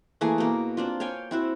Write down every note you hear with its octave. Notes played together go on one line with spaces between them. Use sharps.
E3 A3 A#3 G#4
B2 A#3
C4 D4 F4
C#5 F5 G5 G#5
C4 E4 F#4